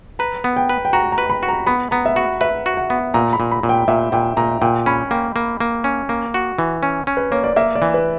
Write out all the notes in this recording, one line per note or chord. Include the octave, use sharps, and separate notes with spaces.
B4 A#5
B3
G5
B4
G5
F#4 A#5
A#5
B4
B5
F#4
A#5
B3 B5
B3 A#5
E5
F#4 F#5
B4 E5
F#4
F#5
B3
A#2 A#5
B5
A#2
B5
A#2
G5
A#2 E5
A#2 G5
A#2 A#5
A#2 G5
C#4 B5
A#3 G5
A#3
A#3
C#4
A#3
F#4
E3
C#4
C#4
B4
A#3 C#5
D5
A#3 E5
D5
E3
B4